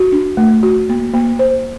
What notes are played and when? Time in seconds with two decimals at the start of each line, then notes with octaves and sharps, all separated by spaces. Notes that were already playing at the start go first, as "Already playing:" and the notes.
Already playing: F#4
0.12 D4
0.37 A3
0.63 F#4
0.89 A#3
1.14 A#3
1.39 C5